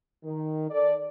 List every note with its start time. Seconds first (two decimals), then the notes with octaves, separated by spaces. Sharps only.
0.24 D#3
0.70 A4 D5